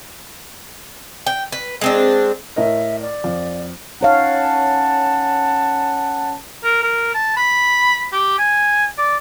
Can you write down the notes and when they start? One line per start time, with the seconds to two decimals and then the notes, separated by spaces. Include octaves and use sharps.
1.26 G5
1.52 B4
1.81 G#3 C4 D4
2.56 A2 A#4 D#5 E5
3.00 D5
3.24 F2
4.01 C#4 D#4 C#5 F5 F#5 A5
6.64 A#4
6.83 A#4
7.14 A5
7.36 B5
8.12 G4
8.38 G#5
8.98 D5